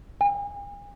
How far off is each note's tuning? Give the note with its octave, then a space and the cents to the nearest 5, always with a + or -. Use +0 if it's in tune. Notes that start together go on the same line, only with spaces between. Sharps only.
G#5 -45